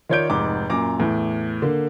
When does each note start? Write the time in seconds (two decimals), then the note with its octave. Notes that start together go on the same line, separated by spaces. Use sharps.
0.09 D#3 F4 C#5 D5 G6 D7
0.30 F1 G#2 D6
0.69 F#2 A#2 A#5 D6
1.00 E2 A2
1.62 D3 A#3